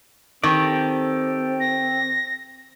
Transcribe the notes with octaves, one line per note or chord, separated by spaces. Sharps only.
D#3 C4 G4 A4 D5
A#6